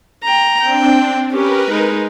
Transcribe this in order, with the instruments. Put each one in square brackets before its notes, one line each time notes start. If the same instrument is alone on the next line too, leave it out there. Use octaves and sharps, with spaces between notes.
[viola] G5 A#5
[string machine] C4 D4 [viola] G5
[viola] C#4 G4 [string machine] A#4 B4
[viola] G#3 D#4